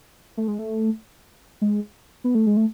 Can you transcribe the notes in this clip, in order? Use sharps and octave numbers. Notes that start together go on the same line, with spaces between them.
A3
G#3
A3
G#3
B3
A3
G#3
A3